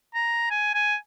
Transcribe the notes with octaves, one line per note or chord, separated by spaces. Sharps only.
A#5
G#5
G#5